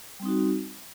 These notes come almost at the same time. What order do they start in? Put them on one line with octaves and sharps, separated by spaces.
G3 C4 D#4 F#4